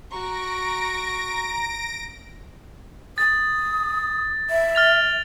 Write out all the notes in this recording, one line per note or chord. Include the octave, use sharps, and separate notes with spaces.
F#4 A#5 C#6 A#6 D7
D#6 A6
E5
F6 A6 F7